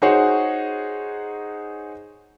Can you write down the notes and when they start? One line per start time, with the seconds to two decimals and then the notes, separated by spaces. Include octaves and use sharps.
0.02 D#4 F#4 G#4 C5 C#5 F#5